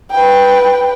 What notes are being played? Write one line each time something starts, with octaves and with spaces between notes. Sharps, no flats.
B4 G5